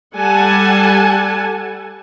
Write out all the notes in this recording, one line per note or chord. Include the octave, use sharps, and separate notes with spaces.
G3 A4 F#5 G#5 A5